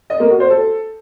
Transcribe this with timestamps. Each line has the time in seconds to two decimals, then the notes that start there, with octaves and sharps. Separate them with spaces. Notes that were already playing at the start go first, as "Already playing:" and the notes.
0.10 D#5
0.20 A#3
0.30 F#4
0.40 C5
0.50 A4